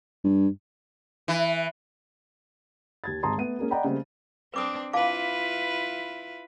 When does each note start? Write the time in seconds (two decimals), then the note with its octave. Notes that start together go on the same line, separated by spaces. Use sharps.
0.24 G2
1.28 E3
3.04 D#2 G#6 A6
3.23 G#1 G#3 A5 A#5 C6 D#6
3.38 A3 B3 D#7
3.59 A#3 C#4 G#4 A#4
3.71 D5 D#5 F#5 G5 A#5 B5
3.84 C#3 G3 A3 A#3 C4
4.54 C4 D4 B4 D6 D#6
4.93 E4 F4 B4 F5 A5 D6